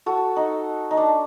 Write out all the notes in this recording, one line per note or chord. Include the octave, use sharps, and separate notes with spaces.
F#4 A4
D#4
D#4
D4